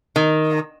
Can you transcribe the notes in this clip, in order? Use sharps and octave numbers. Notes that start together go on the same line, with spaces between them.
D#3